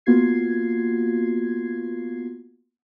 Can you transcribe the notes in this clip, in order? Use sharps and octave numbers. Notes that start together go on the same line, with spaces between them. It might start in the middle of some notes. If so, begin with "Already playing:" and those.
A#3 B3 F4 F#4 G#6 C7